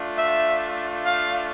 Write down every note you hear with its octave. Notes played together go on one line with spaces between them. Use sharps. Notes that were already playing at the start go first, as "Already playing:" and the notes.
Already playing: A3 D4 F4
E5
F5